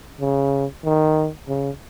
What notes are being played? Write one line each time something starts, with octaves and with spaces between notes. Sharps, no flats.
C#3
D#3
C#3